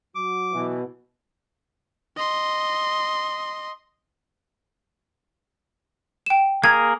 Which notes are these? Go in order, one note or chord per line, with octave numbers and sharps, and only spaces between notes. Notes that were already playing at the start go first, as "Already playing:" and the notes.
F#3 F#4 D6
B2 E3
D#5 C6
G5 E7
A#3 G#4 A#4 G#6